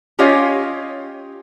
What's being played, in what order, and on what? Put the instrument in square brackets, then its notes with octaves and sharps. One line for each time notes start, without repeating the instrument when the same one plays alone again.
[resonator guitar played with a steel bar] C#4 F4 G4 C#5 D#5 F5